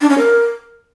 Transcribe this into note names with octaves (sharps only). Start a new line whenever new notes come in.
D4
C#4
A#4